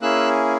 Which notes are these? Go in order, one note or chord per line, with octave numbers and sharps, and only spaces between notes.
A#3 C#4 E4 G#4 E6 F#6